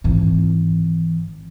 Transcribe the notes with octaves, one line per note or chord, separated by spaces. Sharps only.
G#1 E3